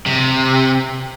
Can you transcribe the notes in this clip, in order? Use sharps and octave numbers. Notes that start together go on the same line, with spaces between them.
C3